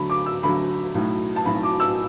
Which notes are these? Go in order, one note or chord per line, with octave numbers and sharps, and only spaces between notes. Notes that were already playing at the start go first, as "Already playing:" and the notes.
Already playing: D2 D3 F#3 B5
D6
E6
D2 D3 F#3 B5
B1 A2 F#3
A5
B1 A2 F#3 B5
D6
E6